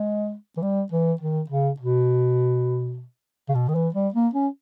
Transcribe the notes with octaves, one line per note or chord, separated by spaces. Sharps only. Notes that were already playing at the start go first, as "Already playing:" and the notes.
Already playing: G#3
E3
G3
E3
D#3
C#3
B2
C#3
B2
D#3
E3
G3
A#3
C#4